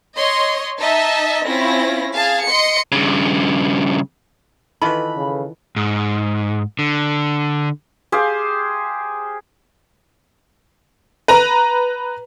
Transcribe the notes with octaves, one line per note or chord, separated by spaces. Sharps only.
C#5 D#5 C6
D#4 D#5 E5 A5
C4 C#4 E4 F4 A#6
G#4 F5 A5
D#5 C6 C#7
G2 C#3
D#3 E3 F4 A4 B4 B5
C#3
G#2
D3
G4 G#4 C5 F5
B4 A#5